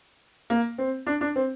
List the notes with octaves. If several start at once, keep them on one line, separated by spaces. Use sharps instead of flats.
A#3
C4
D4
D4
C4